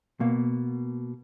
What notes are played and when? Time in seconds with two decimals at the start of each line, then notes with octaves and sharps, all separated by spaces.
0.20 B2 A#3 F5